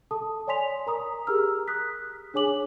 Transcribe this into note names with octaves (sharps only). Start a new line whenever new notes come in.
A4 A5 D#6
C#5 D5 G#5 C6 B6 F7
A#4 A#5 D#6
G4 G#4 A#4 A#5 E6 F6
D#6 F#6 B6
D4 G#4 C#5 G#5 D6 F#7